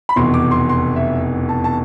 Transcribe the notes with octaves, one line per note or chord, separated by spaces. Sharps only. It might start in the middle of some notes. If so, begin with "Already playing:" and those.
B5
F1 E2 B2 C6
D6
C6
C6
E5
A5
A5